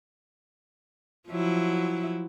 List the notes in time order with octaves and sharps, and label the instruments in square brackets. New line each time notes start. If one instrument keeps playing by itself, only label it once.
[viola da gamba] F3 F#3 E4